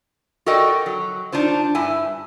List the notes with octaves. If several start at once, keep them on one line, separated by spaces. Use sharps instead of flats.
F#4 A4 A#4 D5 D#5 G5
F#3
D4 D#4 F4 C5
G2 E4 G#5